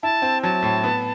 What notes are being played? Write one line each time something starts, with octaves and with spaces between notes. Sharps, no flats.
E4 A5
C4
F#3 A5
A2
B3